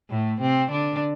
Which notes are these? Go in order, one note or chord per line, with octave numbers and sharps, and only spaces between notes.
A2 A3
C3 C4
D3 D4